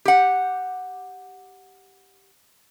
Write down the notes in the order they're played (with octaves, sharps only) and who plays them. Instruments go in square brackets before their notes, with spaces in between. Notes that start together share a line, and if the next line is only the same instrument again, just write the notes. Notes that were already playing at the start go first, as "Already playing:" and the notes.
[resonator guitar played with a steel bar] G4 F#5